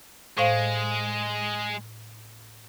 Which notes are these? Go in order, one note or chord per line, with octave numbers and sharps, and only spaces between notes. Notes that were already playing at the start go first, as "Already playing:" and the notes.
A2 G#3 C5 F5